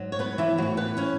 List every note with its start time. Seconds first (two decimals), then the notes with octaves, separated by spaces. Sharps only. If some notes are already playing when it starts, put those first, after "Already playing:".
Already playing: G#2 F#3
0.12 C#5
0.19 B3 B4
0.38 E3 E4
0.58 A2 E3 F#3 F#4
0.77 B3 B4
0.97 C#4 C#5